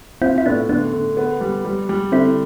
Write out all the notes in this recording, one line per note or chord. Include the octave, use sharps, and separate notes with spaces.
C4 E4 F4
E4
A2 B3 D4
D3 B3 D4
D3
B3
G3
G3
G3
D3 C4 E4